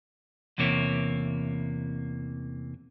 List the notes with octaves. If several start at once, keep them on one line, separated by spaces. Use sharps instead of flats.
E2 C3 E3 A#3 C#5